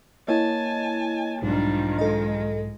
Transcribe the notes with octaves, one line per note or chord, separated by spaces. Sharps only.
A#3 E4 C#5 D#5 G#5 A5
B1 G#2 D#3 F3 G3 D4
G#3 A4 D#5